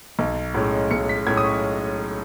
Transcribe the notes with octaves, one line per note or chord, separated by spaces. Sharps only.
B1
A2 G#3 C#4
B1 C#7
B6
A2 G#3 C#4 G#6
D#6
C#6